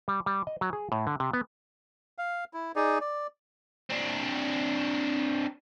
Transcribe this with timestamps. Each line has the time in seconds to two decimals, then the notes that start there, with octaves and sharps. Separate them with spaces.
0.08 G3
0.26 G3
0.47 D#5
0.61 F#3
0.73 G#4
0.92 A2
1.07 D3
1.20 C3
1.33 B3
2.18 F5
2.54 E4
2.76 D#4 G#4 D5
3.01 D5
3.90 C4 D4